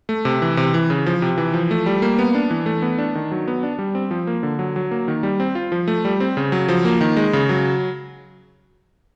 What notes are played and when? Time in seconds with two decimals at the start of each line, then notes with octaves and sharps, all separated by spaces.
0.09 A3
0.25 C3
0.42 E3
0.57 C3
0.74 E3
0.90 C#3
1.06 F3
1.22 C3
1.38 E3
1.53 F3
1.71 A3
1.86 G3
2.02 A#3
2.18 B3
2.35 D4
2.51 E3
2.66 A3
2.82 B3
2.98 D4
3.15 D#3
3.31 F#3
3.48 B3
3.63 D4
3.79 G3
3.95 C4
4.11 F3
4.27 A#3
4.43 D3
4.59 F#3
4.76 F#3
4.91 A#3
5.08 D#3
5.23 G3
5.40 C4
5.55 F4
5.72 F3
5.88 A3
6.05 G3
6.20 C4
6.37 C#3
6.52 F#3
6.68 F3
6.85 A#3
7.01 D#3
7.16 G#3
7.33 C#3
7.49 F#3